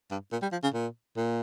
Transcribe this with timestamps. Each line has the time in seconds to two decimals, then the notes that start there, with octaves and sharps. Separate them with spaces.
0.11 G2
0.32 A#2
0.42 G3
0.52 F3
0.63 C#3
0.74 A#2
1.16 A#2